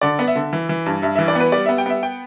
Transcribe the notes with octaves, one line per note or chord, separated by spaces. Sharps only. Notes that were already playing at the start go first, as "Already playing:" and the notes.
D3 D5
B3
E5
D3
E3
E3
G2
G2 E5
E3 E5
D5
B3
B4
G3 D5
B3 E5
G5
B3 E5
G5